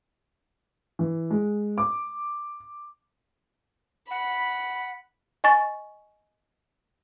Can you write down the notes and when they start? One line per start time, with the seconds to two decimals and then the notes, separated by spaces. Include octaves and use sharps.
0.99 E3
1.31 G#3
1.78 D6
4.11 F#5 B5
5.44 D#5 G#5 C#6 A6